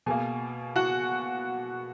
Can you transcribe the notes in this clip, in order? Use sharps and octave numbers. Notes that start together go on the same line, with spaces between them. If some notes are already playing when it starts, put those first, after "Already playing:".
B2 A#3 G#4 G#5
F#4 F#5